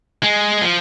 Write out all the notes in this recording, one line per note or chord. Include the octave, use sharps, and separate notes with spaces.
G#3
F3